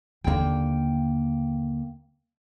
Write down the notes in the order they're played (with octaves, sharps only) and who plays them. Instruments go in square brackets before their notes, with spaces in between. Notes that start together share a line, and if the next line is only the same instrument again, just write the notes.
[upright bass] D#2 D3 [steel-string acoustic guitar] A#3 G5